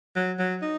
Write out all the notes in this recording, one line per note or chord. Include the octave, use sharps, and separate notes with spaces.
F#3
F#3
D#4